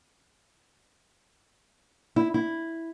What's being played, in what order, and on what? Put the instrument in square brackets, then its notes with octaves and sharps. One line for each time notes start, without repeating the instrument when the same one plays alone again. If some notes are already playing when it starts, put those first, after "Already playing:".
[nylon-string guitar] E4
E4